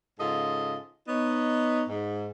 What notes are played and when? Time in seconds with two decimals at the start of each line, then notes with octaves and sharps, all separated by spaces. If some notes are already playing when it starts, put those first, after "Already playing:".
0.20 G#2 C#3 F4 A4 D#5
1.08 B3 D#4 C#5 D#5
1.88 G#2